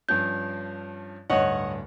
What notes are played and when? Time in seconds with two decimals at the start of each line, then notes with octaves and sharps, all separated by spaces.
0.09 G2 F3 C#4 G6
1.30 D1 G2 C#5 D#5 F#5